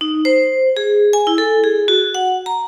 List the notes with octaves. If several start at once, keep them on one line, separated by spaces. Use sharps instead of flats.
D#4
C5
G#4
G#5
E4
A4
G#4
F#4
F#5
A#5